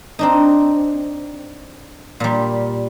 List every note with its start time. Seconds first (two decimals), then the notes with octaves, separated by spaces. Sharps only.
0.19 C4 D4 D#4
2.20 A#2 G3